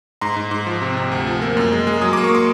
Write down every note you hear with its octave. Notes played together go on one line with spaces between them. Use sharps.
G#2 A#5 C6
G#2
G#2
F3
C3
C3
D2
F3
A#3
F#2
G#3
G#3
F#3 D#6
A#3 D6
C#6
C6 D6